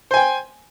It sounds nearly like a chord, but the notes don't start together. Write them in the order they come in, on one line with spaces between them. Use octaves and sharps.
C5 G#5 G5